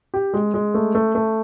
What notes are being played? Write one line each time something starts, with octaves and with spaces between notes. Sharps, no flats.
G4
G#3
G#3
A3
A3
A3